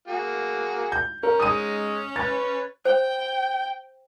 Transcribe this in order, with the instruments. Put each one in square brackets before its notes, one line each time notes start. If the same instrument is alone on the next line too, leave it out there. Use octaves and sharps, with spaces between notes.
[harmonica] A#3 F#4 G#4
[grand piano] G6
[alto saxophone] C#4 [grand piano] A#4
[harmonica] G#3 D#4 [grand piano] D#6 D#7
[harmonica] B4 C#5 [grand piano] A6
[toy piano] C5 [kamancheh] G5